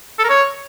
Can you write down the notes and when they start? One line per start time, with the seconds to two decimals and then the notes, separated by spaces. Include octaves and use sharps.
0.19 A4
0.24 A#4
0.29 C#5